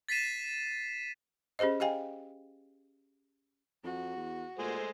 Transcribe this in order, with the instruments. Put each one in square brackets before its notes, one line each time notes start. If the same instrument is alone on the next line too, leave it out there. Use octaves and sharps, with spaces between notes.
[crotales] A6 B6 C7 D#7 E7
[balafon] C#4 G4 G#4 C5 D#5
G4 D#5 F5 G5 G#5
[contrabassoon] F2 [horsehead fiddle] F#4
[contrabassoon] E2
[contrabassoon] A#2 [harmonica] G#3 A3 C5